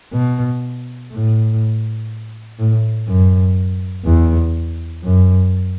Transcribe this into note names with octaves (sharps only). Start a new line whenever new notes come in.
B2
A2
A2
F#2
E2
F#2